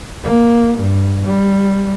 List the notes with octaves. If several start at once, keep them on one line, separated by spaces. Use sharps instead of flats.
A#3
G2
G3